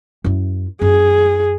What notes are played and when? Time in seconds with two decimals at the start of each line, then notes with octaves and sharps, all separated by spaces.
0.24 F#2 E4
0.81 F#2 G#4